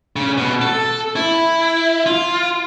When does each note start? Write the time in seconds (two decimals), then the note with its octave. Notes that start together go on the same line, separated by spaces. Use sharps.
0.16 C#3
0.38 B2
0.62 A4
1.16 E4
2.06 F4